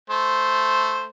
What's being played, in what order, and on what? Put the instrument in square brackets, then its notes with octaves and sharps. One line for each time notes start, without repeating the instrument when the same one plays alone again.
[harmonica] A3 C5